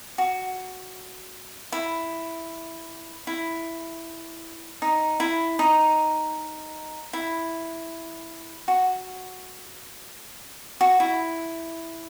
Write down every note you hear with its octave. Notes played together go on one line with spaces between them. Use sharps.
F#4
E4
E4
D#4
E4
D#4
E4
F#4
F#4
E4